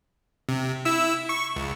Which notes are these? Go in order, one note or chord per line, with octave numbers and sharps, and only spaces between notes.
C3
E4 E6
C#6
C#2